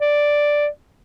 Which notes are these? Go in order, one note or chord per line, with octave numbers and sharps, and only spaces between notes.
D5